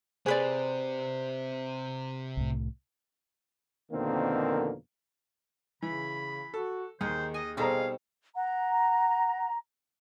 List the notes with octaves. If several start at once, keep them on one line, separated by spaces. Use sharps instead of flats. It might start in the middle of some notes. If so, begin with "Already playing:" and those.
C3 G#4 B4 C5 D5
C2 A2
F2 B2 D3 D#3 A#3 C4
C#3 E3 B5
F#4 A4
D#2 D#3 G#4 C5
D#5 G#5
B2 G3 C4 D#4 G#4 A4 F5 A#5
F#5 A#5